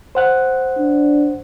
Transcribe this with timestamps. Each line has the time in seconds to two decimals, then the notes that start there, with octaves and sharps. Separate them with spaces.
0.15 C5 F#5 F#6
0.78 D4